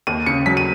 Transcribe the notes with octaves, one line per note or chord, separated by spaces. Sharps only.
D#2 D#7
C#3 C#7
F#3 B6
D#7